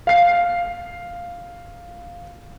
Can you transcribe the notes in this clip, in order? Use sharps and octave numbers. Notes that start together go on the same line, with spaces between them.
F5 C7